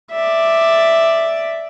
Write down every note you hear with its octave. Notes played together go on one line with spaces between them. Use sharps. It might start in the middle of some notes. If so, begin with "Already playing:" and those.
D5 E5